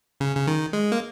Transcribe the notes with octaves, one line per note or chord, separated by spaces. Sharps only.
C#3
C#3
D#3
G#3
A#3